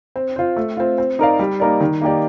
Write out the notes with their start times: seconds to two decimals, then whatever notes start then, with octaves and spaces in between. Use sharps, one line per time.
0.16 C4
0.36 F4 C5
0.56 A3
0.77 C4 F4
0.98 C4
1.19 D#4 A#4 D5 F5
1.39 G3
1.60 A#3 D#4 A#4 D5
1.80 D#3
2.01 A#3 D#4 G4 D5